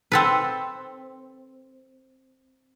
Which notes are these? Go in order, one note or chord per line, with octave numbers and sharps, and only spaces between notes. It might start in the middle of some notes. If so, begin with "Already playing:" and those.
C4 A4 B4